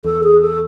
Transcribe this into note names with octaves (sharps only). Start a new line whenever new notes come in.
E2 A4
G#4
A4